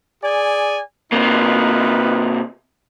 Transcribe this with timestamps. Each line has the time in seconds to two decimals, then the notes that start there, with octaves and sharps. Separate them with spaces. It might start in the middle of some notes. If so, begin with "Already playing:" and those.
0.23 G#4 D5 G#5
1.12 C3 A#3 D#4 F4 B4